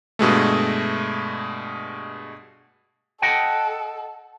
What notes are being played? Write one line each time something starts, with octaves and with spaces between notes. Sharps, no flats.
G2 B2 G#3 A3
A4 D#5 F#5 G5